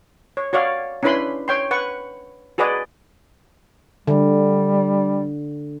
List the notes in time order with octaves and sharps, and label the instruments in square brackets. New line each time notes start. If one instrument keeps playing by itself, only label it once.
[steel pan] C#5
F#4 C#5 D5 F5
C#4 D4 E4 B4 B5 C6
C#5 G5 C6
B4 F#5 C#6
F#4 G#4 B4 D5 D#5
[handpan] D3 [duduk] G3